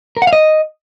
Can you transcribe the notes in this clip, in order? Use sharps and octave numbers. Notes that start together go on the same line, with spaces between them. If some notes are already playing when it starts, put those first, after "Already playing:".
A#4
F#5
F5
D#5